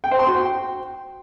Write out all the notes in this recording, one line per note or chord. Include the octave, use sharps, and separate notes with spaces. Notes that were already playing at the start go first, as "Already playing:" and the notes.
G5
C5
C6
F#4
G5